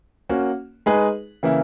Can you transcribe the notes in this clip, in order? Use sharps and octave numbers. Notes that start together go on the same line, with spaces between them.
A#3 C#4 F#4
G#3 D#4 G#4 B4
C#3 E3 A#3 E4